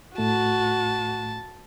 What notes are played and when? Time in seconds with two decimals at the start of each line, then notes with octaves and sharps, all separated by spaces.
0.18 A2 A3 F#4 A5